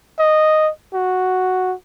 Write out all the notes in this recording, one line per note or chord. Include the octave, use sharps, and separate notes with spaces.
D#5
F#4